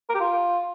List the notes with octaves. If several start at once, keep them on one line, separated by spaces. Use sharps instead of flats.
A#4
G4
F4